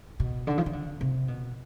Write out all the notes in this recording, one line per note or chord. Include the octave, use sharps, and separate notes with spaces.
B2
D3
F3
E3
D3
C3
B2